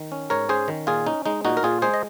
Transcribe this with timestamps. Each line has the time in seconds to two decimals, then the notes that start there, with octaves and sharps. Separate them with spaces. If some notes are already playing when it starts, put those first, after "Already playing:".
Already playing: D#3
0.12 C#4
0.30 G#2 A#4 C#5
0.49 C#4 G#4 C5
0.68 D#3
0.87 A#2 F4 G#4
1.07 C#4 D#4
1.26 G#3 D#4
1.45 A#2 D#4 F#4
1.57 A#4
1.63 A#2 F4 G#4
1.82 G#3 G#4 C5
1.94 D#5